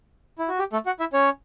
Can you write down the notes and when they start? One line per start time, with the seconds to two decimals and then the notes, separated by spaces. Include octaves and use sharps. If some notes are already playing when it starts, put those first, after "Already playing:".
0.39 E4
0.48 F#4
0.59 G4
0.73 A3 A4
0.86 F#4 F#5
1.00 E4 E5
1.13 C#4 C#5